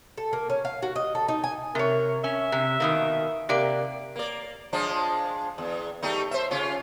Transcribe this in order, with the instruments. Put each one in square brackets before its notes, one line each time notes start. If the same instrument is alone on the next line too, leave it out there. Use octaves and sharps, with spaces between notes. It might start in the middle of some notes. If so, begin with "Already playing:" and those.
[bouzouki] A4
A#3
C#4
F5
F#4
D#5
A4
D#4
G#5
[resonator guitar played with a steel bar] C3 C#5 [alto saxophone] A#4
[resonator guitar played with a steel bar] C#4 [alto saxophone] E5
[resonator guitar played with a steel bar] C3
B2 D#3 A#3
[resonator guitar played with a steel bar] C3 A#3 D5 [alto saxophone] G4
[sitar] A#3 D5
F3 G#3 D4
E2
G3 A3 D#4
C5 E5
C#3 C#4 F4